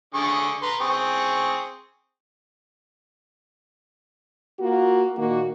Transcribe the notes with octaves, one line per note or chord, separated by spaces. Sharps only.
D3 G#4 C#6
B4 A#5 C6
C4 G#4 C#6
A#3 F4 F#4
A#2 D#3 A#3 F#4